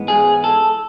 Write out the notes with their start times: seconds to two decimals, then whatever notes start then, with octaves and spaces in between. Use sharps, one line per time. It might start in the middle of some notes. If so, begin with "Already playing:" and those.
Already playing: G#2 E3 G#3 B3
0.08 G#4
0.44 A4